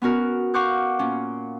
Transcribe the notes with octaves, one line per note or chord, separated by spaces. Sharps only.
B3 C#4 F#4 A#4
F5 F#5 C#6 D6 F#6 G6
A#2 C#4